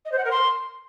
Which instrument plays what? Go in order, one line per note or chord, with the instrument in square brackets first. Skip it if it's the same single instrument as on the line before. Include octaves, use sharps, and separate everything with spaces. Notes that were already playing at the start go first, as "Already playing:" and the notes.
[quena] D#5
C5
F#5
A#4
C6